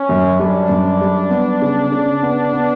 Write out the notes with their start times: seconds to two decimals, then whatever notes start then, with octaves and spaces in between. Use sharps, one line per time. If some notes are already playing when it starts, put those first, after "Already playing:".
Already playing: C#4
0.09 F#2
0.39 G3 D4
0.69 F#2
1.01 G3
1.31 B3
1.62 C#3
1.92 C#3
2.23 B3
2.53 B3